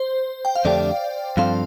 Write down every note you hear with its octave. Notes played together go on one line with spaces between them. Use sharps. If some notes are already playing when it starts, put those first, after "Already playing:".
Already playing: C5
G5
F5
F2 D3 A3 D4 G4 D5
G2 F3 C4 A4 C5 F5